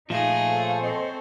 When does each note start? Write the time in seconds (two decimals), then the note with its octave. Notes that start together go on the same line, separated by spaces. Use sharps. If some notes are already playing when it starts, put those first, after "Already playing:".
0.10 A#2 F3 A3 D#4 G#4 F5
0.49 A4 C5 C#5
0.81 C4 D#5